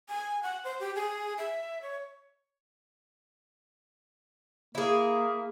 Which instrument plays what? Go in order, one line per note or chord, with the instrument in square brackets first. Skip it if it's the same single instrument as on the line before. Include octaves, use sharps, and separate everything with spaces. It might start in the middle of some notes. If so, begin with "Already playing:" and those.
[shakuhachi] G#5
F#5
C5
G4
G#4
E5
C#5
[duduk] A#3 [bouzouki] E4 G#4